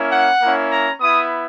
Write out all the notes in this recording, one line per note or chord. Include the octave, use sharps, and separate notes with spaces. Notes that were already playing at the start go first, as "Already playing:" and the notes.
Already playing: A#3 C#4 E4
F#5
A#3 C#4 E4
A#5
B3 E4 D#6